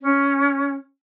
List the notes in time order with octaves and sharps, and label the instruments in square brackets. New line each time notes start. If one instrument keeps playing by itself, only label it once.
[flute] C#4